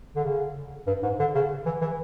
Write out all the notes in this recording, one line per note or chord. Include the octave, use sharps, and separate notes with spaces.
D3
C#3
G2
G#2
D3
C#3
E3
E3